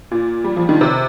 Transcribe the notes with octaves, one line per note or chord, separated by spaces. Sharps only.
A#2
G3
F3
D#3
C3